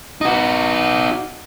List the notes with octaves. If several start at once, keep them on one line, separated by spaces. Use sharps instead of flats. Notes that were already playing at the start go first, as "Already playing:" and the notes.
D#4 F#4